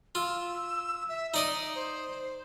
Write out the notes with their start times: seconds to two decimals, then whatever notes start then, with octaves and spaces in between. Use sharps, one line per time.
0.15 F4 E6
1.09 E5
1.34 D#4 D5 D#5 D#6
1.75 C5